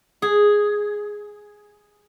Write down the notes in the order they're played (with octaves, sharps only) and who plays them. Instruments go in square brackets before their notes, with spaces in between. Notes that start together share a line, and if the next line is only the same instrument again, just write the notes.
[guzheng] G#4